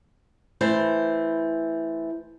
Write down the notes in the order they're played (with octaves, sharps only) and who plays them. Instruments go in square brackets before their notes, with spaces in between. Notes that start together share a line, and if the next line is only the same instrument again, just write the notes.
[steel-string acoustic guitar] E3 A3 C5